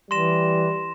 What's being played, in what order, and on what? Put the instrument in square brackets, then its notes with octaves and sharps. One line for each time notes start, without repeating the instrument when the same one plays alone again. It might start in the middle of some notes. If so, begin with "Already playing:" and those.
[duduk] E3 [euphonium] G3 [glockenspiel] C6 A#6 E7